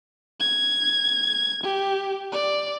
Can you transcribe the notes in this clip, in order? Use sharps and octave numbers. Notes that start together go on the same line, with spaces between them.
G#6
G4
D5